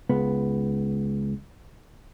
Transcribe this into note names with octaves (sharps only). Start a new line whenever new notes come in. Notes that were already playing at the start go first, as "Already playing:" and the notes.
C#2 B3